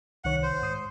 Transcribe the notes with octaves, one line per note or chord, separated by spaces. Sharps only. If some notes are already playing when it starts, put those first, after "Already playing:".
C2 D#3 C#5 F#5
C5
G#2 D#6 C7